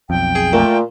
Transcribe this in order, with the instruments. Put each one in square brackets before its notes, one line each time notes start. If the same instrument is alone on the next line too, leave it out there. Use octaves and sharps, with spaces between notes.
[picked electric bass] B1 F2 [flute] G5
[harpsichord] G#4
[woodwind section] A#2 [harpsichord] A3